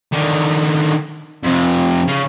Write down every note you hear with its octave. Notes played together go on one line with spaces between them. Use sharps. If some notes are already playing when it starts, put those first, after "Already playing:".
D3 D#3
F2 C3
C#3